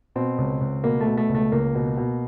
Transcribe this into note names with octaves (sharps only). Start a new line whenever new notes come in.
B2 C4
C#2
C#2
B2 A#3
A3
B2
A3
C#2
A3
C#2 A#3
B2
B2